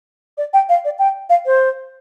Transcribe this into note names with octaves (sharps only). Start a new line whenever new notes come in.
D5
G5
F5
D5
G5
F5
C5